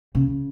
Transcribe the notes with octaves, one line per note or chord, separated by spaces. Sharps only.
C#3